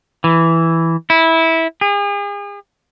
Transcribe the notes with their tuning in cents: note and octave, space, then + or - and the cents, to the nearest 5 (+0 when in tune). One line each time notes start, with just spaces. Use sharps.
E3 +0
E4 -15
G#4 -40